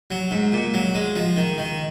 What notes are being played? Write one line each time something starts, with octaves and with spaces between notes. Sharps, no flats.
F#3
G#2
A#2
F#3
G#3
F3
D#3
D#3